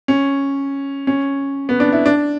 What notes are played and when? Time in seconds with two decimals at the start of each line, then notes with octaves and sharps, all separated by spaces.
0.08 C#4
1.07 C#4
1.69 B3
1.80 D4
1.92 E4
2.06 D4